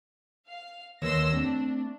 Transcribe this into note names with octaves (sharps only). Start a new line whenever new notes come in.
F5
D#2 B4 C#5 C6 E6 A#6
A3 C4 D4